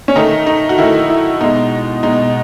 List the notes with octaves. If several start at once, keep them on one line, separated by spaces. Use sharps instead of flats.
C#4
D#3 A3 D#4
D#4
F#4
D#3 A3 E4
E4
B2 G#3 D#4
B2 G#3 D#4